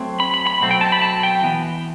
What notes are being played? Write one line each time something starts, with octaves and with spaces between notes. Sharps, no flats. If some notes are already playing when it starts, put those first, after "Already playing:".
Already playing: F#3 A3 C4
B5
B5
B5
B2 F#3 A3 C4
G5
A5
B5
A5
G5
E3 B3